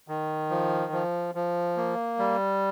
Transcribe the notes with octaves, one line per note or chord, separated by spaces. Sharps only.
D#3
F3
F3
F3
A#3
G3